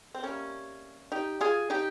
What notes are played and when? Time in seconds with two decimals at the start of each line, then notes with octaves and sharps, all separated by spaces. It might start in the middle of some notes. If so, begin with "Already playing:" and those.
0.15 C4
0.23 C3 G3 A#3 C#4
1.12 D#4 G4
1.41 F4 G#4
1.70 D#4 G4